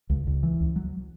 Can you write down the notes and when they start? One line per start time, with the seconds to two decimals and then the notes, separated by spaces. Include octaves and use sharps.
0.10 C#2
0.27 C#2
0.43 E3
0.60 C#2
0.76 F#3